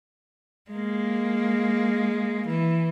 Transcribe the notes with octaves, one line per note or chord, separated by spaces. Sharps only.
G#3 A#3
E3